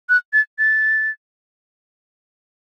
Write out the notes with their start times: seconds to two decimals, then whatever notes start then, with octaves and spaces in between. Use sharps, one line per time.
0.09 F#6
0.33 A6
0.59 A6